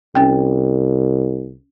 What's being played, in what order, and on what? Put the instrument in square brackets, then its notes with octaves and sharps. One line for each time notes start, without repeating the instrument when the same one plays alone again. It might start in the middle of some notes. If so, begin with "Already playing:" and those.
[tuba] C2 [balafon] C#4 G5